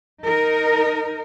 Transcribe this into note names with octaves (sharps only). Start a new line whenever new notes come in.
D#4 A#4